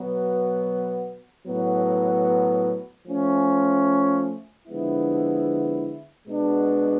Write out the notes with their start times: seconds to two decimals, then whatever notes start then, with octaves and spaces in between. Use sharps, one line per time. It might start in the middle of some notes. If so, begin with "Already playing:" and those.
Already playing: B2 F#3 B3
1.47 A2 F#3 B3
3.06 F3 A3 C#4
4.67 D3 F3 G#3 B3 E4
6.27 B2 G#3 B3 D4